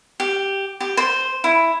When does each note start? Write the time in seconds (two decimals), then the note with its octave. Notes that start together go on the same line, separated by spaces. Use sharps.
0.20 G4
0.81 G4
0.97 C5
1.44 E4